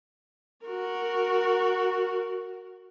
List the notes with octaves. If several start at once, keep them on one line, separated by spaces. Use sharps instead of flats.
F#4 A#4